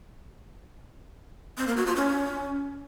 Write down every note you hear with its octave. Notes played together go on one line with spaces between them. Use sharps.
C4
A#3
F#4
F4
C#4